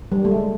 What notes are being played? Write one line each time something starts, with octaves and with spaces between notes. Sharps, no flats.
G3
A3
G#3